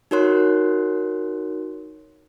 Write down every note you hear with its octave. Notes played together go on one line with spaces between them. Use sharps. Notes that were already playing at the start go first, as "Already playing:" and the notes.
D#4 F#4 A#4 C#5 C6 F#6